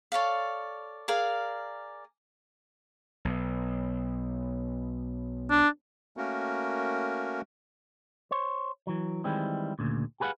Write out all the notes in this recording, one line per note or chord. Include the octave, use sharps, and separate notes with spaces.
A4 C#5 D5 F5
G#4 A#4 D5 F5
B1
D4
A3 A#3 C#4 F#4 A#4
C5 C#5
E3 F#3
D#3 E3 G3 G#3 C4 E4
D2 A#2 C#3
G4 G#4 B4 C5 F5 F#5